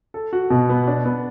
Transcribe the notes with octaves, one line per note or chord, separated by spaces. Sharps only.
A4
F#4
B2 B3
B3
D4
B3